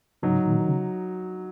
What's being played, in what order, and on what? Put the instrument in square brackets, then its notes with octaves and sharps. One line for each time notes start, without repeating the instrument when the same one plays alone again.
[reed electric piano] G#2 C#3 [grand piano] F#3 D#4
[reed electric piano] A#2 D#3
D#3
C#3